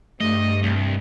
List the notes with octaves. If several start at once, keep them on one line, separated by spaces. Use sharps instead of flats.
G2 A3 D#5
C2